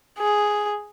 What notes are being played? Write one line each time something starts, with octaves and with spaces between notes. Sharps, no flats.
G#4